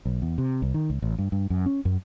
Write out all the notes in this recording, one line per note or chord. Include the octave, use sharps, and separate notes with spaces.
B1
E2
C3
C2
D#3
C#2
A1
G2
G2
F#2
C#4
F#2